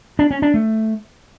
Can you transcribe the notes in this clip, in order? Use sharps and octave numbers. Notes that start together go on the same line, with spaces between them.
D4
C#4
D4
A3